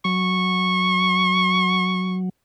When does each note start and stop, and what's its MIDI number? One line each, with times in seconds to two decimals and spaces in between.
0.05 2.29 54
0.05 2.15 85